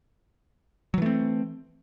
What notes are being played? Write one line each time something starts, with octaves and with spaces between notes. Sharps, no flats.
E3 F#3 A3 C4